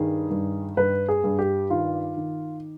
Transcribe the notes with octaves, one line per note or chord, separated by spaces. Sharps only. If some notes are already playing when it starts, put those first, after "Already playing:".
Already playing: G2 D#3 G#4
G2
G2 B4
G#4
G2
G4
D#3 F4
D#3